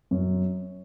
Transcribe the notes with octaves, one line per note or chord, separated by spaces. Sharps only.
F#2